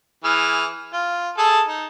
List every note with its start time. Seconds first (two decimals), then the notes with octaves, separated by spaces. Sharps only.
0.24 E3 G#4 F6
0.93 F4
1.38 G#4 A4 A5
1.68 D#4